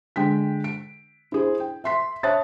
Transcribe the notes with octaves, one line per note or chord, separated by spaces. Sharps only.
D3 G#3 G5 B6
D7
E4 G#4 C5
G5
E5 C6 B6
C#5 E5 A5 D#6 F#6 A6